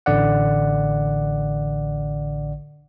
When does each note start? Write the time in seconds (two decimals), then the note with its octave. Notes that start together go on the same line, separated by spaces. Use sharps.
0.06 A1 D3 D5 F#5